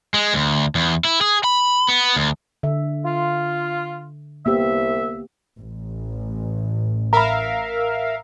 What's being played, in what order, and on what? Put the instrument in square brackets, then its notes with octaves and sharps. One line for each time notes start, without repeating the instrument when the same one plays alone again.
[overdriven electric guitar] G#3
D2
E2
E4
G#4
B5
B3
D2
[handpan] D3 E5
[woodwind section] F4
[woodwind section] C2 E5 [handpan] A#3 B3 G4
[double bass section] A1
[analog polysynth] A#4 E5 F5 [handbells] A#5 B5